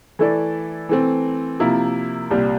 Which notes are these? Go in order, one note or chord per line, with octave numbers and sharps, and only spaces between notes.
E3 A3 E4 A4 D5
E3 A3 C4
C3 F3 A#3 E4
C2 A#2 G3